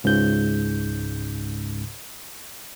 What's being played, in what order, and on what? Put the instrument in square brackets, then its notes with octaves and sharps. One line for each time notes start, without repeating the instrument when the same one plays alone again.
[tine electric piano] C#2 G#2 C#3 G6